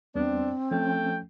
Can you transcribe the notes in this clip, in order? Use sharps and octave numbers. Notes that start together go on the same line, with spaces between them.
E2 G3 B3 C4 D4
F3 A3 C#4 G5